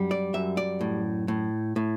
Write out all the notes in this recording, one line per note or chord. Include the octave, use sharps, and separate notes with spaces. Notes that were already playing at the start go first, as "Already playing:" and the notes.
Already playing: F#2 G3
D5
F#2 E5
D5
A2
A2
A2